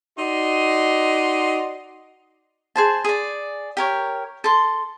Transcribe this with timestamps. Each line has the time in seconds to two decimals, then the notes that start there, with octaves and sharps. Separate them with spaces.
0.18 D#4 F#4 D5 D#5 C6
2.76 G#4 C5 A5
3.04 G#4 D5
3.77 G4 A#4 C#5
4.44 A4 C6